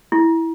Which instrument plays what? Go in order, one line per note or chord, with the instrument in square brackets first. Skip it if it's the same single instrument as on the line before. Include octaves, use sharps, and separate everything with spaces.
[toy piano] E4